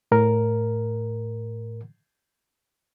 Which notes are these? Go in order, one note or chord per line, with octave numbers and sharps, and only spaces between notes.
A2 A#4